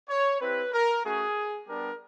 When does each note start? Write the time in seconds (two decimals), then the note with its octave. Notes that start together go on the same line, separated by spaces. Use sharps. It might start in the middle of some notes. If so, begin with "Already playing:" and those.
0.10 C#5
0.41 C4 E4 G4 B4
0.73 A#4
1.05 A3 C#4 F#4 G#4
1.68 G3 B3 D4 G4 A#4